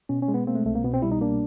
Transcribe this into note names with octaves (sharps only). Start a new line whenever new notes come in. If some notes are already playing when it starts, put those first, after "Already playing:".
B2 C#4
C#4
G#3
B3
A#3 C4
A3
C2 A3
A#3
B2 B3
C4
G3 E4
D#4
A#3 D4